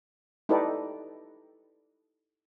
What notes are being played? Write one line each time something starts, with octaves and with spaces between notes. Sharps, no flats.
D#4 E4 G4 A4 B4 D5